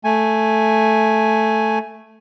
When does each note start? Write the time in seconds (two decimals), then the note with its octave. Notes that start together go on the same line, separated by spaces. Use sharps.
0.04 A3 G#5